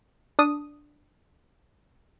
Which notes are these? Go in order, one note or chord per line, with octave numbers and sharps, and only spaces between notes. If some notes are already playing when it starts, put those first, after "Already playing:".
D4 D#6